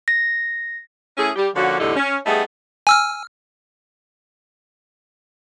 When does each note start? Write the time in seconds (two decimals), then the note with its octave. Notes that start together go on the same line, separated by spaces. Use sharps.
0.08 A#6
1.17 A3 C#4 E4 G#4
1.36 G3 G4
1.55 D3 F3 A#3 C#4 F#4
1.80 E2 A2 D3 D#4 E4 G4
1.96 C#4
2.26 G3 A3 B3 D#4 G#4
2.87 G#5 E6 F6